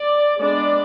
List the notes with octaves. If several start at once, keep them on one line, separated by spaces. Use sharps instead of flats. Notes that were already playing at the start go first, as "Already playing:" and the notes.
Already playing: D5
G#3 B3 D4 D5